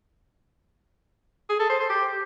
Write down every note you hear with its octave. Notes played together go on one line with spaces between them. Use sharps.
G#4
A4
C5
C5
G4